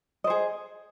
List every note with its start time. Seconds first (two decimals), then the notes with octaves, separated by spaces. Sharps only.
0.24 D#5
0.27 C5
0.30 G#4